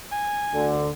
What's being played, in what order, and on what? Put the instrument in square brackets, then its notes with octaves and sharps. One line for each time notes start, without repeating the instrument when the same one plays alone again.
[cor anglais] G#5
[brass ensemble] D2 D3